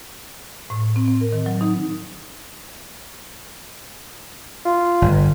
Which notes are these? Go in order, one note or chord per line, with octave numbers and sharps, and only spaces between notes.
A2
C4
C4
A#4
D#3
F#3
D#4
F4
G1